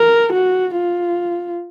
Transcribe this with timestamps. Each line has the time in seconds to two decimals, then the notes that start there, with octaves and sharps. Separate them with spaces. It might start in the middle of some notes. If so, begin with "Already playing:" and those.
Already playing: A#4
0.33 F#4
0.76 F4